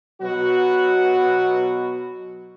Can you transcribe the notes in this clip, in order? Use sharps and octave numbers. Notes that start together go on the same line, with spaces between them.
B2 F#3 F#4